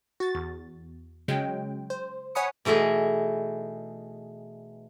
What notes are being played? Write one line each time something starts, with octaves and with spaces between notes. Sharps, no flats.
F#4 A6
E2
C#3 F#3 G#3 G5
C5
C#5 F#5 G#5 B5 D#6 C#7
B2 E3 A3 D#4 G#4